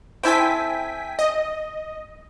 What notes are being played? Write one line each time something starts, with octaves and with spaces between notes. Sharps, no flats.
C4 E4 A4 G5 G#5 B6
D#5